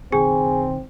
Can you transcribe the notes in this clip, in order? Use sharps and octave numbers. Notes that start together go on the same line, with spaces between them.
F#1 B1 D#3 C4 G#4 G#5